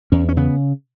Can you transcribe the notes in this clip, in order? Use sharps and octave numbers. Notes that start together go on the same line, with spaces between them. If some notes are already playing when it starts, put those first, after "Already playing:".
E2 C#4
C#4
C#3 B3